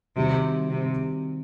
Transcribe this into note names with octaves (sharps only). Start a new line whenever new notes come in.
C3 D#3 G3 C4 F#4
C3